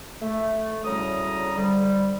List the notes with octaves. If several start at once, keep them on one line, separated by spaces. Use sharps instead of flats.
A3
D2 A2 C#3 G3 A#5 D#6
F2 D3 G3